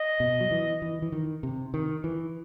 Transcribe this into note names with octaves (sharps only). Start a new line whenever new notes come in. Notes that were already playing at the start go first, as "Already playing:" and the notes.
Already playing: D#5
B2
F#3
E3
E3
E3
D#3
C3
D#3
E3